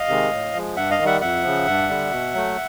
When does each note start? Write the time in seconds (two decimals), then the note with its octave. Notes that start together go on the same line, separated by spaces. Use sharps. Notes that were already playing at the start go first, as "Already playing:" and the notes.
Already playing: D#5 F5
0.08 C3 D#3 G#3
0.31 A2
0.54 F3 G#3
0.76 G2 E5 F#5
0.91 D#5 F5
0.98 D#3
1.04 G3 E5 F#5
1.21 F2 E5 F#5
1.44 C#3 F3
1.67 G2
1.89 D3 G3
2.11 B2
2.34 F#3 A3